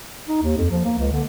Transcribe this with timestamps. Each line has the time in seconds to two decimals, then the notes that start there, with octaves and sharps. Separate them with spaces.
0.28 D#4
0.42 D#2
0.58 F2
0.71 F3
0.84 A#3
0.99 C#2
1.12 D3